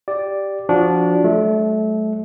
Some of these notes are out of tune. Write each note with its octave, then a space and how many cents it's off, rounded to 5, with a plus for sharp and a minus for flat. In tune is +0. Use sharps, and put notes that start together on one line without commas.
G4 -5 D5 +0
F3 +0 D4 -15 F#4 +0
F#3 +30 A3 -25